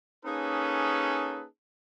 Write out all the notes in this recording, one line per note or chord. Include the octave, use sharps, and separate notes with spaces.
A#3 C#4 D#4 G#4 A4 B4